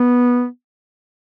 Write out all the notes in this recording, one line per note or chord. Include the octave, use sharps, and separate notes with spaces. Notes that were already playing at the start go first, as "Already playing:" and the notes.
Already playing: B3